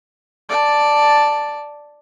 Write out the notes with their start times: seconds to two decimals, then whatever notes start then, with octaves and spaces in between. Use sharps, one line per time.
0.49 D5 A5